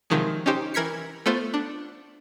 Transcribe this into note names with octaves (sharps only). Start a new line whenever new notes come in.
C3 D#3 F3 F#3 G#3
C#4 D#4 G4 C5
E3 A#4 G#6 B6 C#7
A3 B3 F4 C5
D4